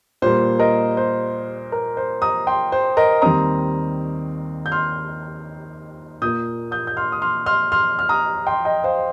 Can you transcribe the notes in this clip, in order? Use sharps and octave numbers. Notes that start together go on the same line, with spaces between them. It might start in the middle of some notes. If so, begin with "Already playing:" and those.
A#2 G3 A#3 C5
A#4 D#5
C5
A#4
C5
A#5 D#6
G5 C6
C5
A#4 D#5
D#2 D#3 G3 C4 A#5 D#6
G6
C6 F6
A#2 A#3 D#6 G6
D#6 G6
G6
C6 F6
D#6
C6 F6
C6 F6
C6 F6
F6
A#5 D#6
G5 C6
D#5 G5
C5 F5